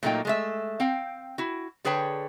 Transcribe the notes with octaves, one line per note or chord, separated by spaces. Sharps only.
A#2 F#3 A3 A#3 D#4 G5
G#3 A3 E5
C4 F5 G5
E4 F#4
D3 G#4 B4 C#5 G5 A5